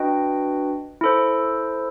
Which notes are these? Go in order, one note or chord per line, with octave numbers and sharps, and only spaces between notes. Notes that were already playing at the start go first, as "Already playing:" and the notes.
Already playing: D4 F#4 B4 D#5 G5
E4 A4 C5